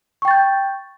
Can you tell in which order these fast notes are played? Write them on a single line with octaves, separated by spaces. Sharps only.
C#6 G5 A6 G6